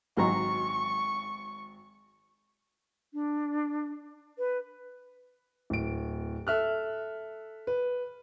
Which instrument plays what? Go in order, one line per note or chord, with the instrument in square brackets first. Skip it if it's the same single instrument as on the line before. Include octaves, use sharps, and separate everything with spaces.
[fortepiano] G#1 F#3 A#5 [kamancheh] C#6
[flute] D4
B4
[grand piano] D1 D7
A4 E5 F6 F#6
B4